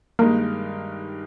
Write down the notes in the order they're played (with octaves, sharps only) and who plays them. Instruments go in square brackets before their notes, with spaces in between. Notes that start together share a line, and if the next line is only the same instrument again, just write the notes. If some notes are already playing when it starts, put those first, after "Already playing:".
[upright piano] G2 D#3 G#3 D#4 A#4 [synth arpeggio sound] A#3